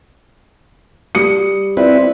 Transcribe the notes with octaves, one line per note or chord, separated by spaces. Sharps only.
G3 D#6 C#7
C4 E4 F4 B4 D5